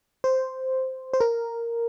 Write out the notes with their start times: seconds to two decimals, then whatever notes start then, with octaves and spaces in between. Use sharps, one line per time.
0.24 C5
1.13 C5
1.20 A#4